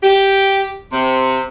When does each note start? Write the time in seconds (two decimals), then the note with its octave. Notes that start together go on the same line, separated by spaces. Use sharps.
0.03 G4
0.92 C3 C4